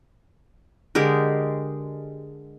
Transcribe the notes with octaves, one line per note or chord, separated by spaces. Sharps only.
D3 G#3 G4 A#4